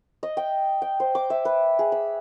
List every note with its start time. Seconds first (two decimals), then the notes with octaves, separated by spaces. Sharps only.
0.23 D#5
0.37 G5
0.82 G5
1.00 C5
1.15 D6
1.30 E5
1.45 B4
1.79 G#4
1.92 B5